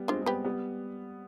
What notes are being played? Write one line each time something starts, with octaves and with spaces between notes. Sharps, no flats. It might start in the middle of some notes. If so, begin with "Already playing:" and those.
Already playing: G3 B3
G#3 C4 D4 F4
G#3
G3 B3 G4 B4
G3 B3